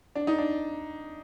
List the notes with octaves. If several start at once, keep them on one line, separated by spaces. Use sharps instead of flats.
D4
D#4
D4